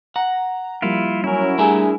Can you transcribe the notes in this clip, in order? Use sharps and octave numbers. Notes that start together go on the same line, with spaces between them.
F#5 A#5
F3 G3 A#3 E4 F4
F#3 C#4 E4 A#4
G3 A3 D4 G#4 E5 F#5 G#5 A#5